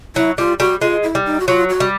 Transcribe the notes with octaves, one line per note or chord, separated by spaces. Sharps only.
F#3 E4
G3 F4
G3 F#4
G#3 F4
E4
G3
D#4
F#4
F#3 F4
F#4
G3